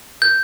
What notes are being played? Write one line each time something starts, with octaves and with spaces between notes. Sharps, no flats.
G6